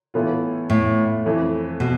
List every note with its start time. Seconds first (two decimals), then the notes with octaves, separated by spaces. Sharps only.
0.14 A2 E3 B3 F4
0.70 A2
1.25 F2 E3 A3
1.80 B2